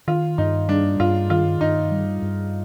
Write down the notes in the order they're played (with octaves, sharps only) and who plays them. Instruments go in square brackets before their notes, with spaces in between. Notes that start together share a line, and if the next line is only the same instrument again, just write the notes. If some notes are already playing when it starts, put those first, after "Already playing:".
[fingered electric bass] D#3 [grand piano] F4
[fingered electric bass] G2 [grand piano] D#4
[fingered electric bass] G3 [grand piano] D4
[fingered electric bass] G2 [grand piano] F4
[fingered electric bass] D#3 [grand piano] F4
[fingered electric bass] G2 [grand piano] D#4
[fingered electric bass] G3
G2